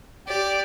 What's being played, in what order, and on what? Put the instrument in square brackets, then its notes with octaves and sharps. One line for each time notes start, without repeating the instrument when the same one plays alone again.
[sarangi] G4 [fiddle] D5